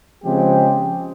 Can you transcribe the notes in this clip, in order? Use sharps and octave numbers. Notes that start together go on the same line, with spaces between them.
C#3 F3 G#3 C4 G4